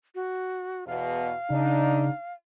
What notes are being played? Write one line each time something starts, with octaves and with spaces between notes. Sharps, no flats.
F#4
E2 B2 F5
C#3 D4 D#4